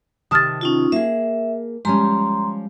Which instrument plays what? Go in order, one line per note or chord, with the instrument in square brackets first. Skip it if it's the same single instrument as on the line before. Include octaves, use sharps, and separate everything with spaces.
[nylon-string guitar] C3 D#3 A5 [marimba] D#6 F6 A6
[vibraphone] C#4 D#4 F4
[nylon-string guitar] A#3 G#4 [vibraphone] E5
[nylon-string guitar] F3 G3 C#4 [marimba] G#3 [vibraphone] A#5 C6